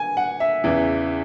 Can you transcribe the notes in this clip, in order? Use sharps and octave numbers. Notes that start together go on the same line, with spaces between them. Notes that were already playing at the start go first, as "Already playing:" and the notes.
Already playing: G#5
F#5
E5
E2 C#3 E3